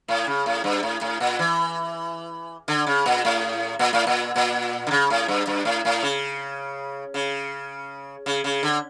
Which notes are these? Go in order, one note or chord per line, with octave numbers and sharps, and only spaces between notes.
A2
C#3
A2
G2
A2
A2
A#2
E3
D3
C#3
A#2
A2
A#2
A2
A#2
A#2
D3
C#3
A2
G2
G2
A2
A2
C#3
C#3
C#3
C#3
D3